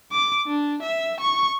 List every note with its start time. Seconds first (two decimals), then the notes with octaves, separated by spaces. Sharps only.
0.12 D6
0.47 D4
0.82 E5
1.20 C#6